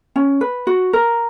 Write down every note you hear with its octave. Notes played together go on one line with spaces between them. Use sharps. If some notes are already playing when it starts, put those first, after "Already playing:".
C#4
B4
F#4
A#4